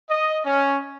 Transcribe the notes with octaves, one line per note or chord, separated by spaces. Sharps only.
D#5
C#4